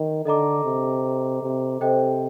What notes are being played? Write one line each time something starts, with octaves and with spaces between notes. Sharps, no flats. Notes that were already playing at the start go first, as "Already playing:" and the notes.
Already playing: D#3
D3 A4 D#5 A#5 D6
C3
C3
C3 A4 C5 D#5 G5